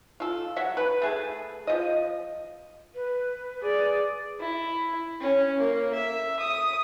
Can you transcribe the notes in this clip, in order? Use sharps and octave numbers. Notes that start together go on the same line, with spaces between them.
F4 A4
F#3 E5 F#5
B4
A3 G#4 A5
F3 D#5
B4
G#4 D5
E4
C#4
A#3
E5
D#6